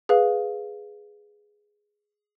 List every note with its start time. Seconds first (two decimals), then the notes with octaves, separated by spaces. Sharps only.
0.09 G#4 B4 F5